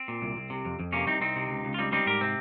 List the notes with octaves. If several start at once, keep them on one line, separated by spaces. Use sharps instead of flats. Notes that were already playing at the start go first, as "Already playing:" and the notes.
Already playing: C4
A#2
C2
C2
C3
F2
F2
C3 A#3 C#4
C2 C4 D#4
C2 C4 D#4
C3
C#2
C#2
F4
G3 C4 D#4
G3 C4 D#4
G#2 G4 A#4
C3 C4